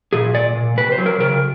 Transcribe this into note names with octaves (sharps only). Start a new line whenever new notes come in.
A#2 G#4
A#2 D5
A#2
C3 B4
C5
F#3
A#4
C#3 A#4